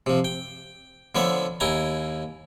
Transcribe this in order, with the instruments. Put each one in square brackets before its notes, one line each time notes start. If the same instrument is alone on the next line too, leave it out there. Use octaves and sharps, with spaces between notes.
[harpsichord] C3 F3
G5
D3 F3 B3 C#5 E5
D#2 E4 G5 G#5 A#5